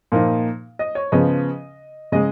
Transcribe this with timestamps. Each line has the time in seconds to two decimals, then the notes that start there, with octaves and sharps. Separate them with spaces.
0.12 A#2 F3 A#3 D#4
0.79 D#5
0.95 C#5
1.12 C#3 F3 B3 D#5
2.12 C#3 G#3 D#5